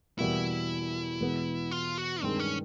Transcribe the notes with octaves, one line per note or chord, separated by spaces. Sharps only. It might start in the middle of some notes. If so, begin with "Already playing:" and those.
E2 B2 G3 A#3 E4
E2 B2 G#3 B3
F4
F#4
G2 D#3 G#3 C4
C#4